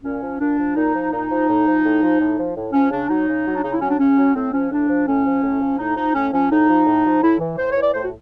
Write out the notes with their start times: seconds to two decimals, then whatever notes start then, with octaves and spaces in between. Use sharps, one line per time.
0.03 A#2 C#4
0.21 F3
0.39 A#2 D4
0.58 F3
0.75 A#2 D#4
0.94 F3
1.11 A#2 D#4
1.29 F3
1.47 A2
1.66 F3
1.83 A2
2.01 F3
2.19 A2
2.37 F3
2.55 A2
2.73 F3 C#4
2.91 C#3 D4
3.09 F#3 D#4
3.27 C#3
3.45 F#3
3.56 D4
3.63 C#3 D#4
3.72 E4
3.81 F#3 C#4
3.90 D4
3.99 C#3 C#4
4.17 F#3
4.35 A2 C4
4.53 F3 C#4
4.71 A2 D4
4.88 F3
5.07 A2 C#4
5.25 F3
5.43 A2
5.61 F3
5.79 A2 D#4
5.96 F3 D#4
6.14 A2 C#4
6.32 F3 C#4
6.50 A2 D#4
6.68 F3
6.86 A2
7.04 F3
7.22 A2 E4
7.40 E3
7.58 A2 C5
7.70 C#5
7.76 E3
7.82 D5
7.94 A2 C5
8.03 F#4